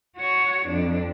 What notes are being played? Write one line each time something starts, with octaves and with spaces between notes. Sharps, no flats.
F#4 C#5
F2 D4